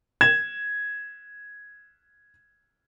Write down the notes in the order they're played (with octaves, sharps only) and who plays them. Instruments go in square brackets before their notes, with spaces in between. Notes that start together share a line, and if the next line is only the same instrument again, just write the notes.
[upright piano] G#6 E7